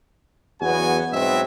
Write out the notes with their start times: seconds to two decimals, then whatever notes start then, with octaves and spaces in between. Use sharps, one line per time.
0.62 E2 C#3 F#3 B3 F#4 G#5
1.12 G#2 B2 F#3 B3 C4 E5